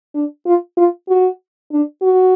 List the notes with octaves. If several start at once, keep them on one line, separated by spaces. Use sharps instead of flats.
D4
F4
F4
F#4
D4
F#4